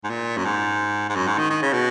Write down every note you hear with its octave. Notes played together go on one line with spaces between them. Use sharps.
G#2
A#2
F#2
G#2
G#2
F#2
G#2
D#3
D#3
C#3
B2